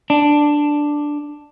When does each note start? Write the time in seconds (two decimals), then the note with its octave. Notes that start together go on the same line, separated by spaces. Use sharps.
0.10 D4